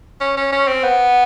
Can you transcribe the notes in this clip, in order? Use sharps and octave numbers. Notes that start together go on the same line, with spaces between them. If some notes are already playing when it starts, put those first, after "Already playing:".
C#4
C#4
C#4
C4
B3